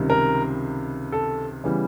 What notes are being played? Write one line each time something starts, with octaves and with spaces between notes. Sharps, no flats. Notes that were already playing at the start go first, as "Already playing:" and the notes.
Already playing: C#2 C3 D#3 G3
A#4
A4
C#3 E3 G3 B3